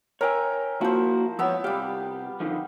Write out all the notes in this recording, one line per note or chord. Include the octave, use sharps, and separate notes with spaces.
A#4 C#5 E5 G5 G#5
F3 A#3 E4 F#4 C5
F3 B3 E4 C#5 E6
C2 G3 G4 F5
D3 D#3 F3